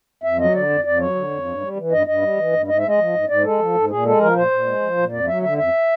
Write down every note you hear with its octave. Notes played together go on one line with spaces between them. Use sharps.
F2 E5
F#3 D#5
D3 D5
F2
F2 D5
F#3 C#5
D3
F2
G2
G3
E3
G2 D#5
G2 D#5
G3
E3
G2
G#2 D#5
E5
G#3
D#5
F3
G#2
G#2 D5
G#3 A4
F3
G#2
A#2 G#4
G#3 A4
F3 A#4
A#2 C5
A#2
G#3
F3
A#2
F2 D5
F#3 E5
D3 E5
F2 E5